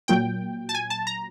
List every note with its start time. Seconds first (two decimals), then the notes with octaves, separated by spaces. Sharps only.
0.08 A#2 F#3 G5
0.69 A5
0.75 G#5
0.90 A5
1.07 A#5